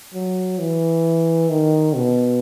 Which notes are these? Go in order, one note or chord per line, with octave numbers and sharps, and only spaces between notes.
F#3
E3
D#3
B2